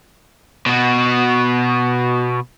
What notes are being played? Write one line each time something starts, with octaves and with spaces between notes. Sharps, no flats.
B2 F#4